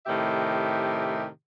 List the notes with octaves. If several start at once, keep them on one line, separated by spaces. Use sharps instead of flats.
A2 C3 D#3 G4 E5